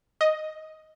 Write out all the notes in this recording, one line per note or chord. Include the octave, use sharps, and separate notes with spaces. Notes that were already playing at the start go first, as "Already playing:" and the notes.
D#5